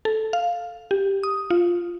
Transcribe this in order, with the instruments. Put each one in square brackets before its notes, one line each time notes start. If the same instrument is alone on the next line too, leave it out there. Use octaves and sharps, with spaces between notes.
[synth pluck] A4
F5
G4
D#6
F4